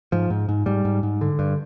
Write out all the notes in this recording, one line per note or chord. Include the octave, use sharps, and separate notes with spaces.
G#2 F3
G#2
G#2
G#2 G3
G#2
G#2
D3
G2